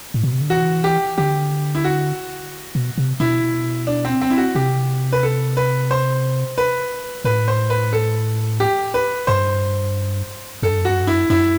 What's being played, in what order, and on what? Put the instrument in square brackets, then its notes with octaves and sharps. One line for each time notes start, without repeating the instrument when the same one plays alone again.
[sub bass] A2
B2
C3
D3
[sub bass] E3 [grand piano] F#4
[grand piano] G4
[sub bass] D3 [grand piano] G4
[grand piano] E4
F#4
[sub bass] B2
C3
[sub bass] B2 [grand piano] E4
[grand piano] D4
C4
C4
E4
F#4
[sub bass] C3 [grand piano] G4
[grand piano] B4
A4
B4
C5
B4
[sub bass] A2 [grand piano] B4
[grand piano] C5
B4
A4
G4
B4
[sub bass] G2 [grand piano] C5
[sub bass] F#2 [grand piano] A4
[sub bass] G2
F#2
[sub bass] G2 [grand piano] F#4
[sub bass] F#2
G2
[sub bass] F#2 [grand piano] E4
[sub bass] F#2 [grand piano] E4